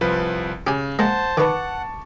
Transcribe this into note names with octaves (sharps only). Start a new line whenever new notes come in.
C2 F3 B4
C#3 G4 G#5
G#3 A#3 C5 F#5 A5
D#3 B4 F#5 A5 C#6 D6